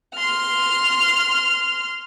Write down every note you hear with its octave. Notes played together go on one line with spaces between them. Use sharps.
C6 F6